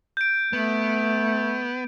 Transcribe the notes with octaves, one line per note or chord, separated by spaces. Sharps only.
G6 D7
A3 B3